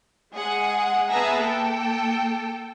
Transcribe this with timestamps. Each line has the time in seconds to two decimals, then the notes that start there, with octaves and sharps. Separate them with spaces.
0.33 G#3 G#4 F#5
1.10 B3 G#4 B4 E5 A5 A#5
1.38 A#3 A4 G5